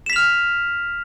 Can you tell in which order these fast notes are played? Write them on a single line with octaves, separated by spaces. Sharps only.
E7 B6 F7 F6